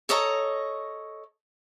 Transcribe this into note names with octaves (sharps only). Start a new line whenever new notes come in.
A4 C#5 D#5 A#5